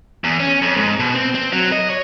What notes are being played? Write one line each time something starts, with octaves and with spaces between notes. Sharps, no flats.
E2
C#4
F2
G#2
B2
C4
C4
F#3
D#5
C#5